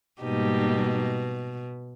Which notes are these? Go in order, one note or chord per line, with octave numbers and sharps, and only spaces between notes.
G#2 B2 G3 A#3 D#4 G4